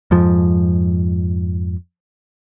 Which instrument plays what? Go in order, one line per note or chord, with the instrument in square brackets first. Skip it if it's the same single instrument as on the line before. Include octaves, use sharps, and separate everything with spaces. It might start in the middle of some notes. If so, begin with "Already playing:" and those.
[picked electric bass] F2 G#2 F3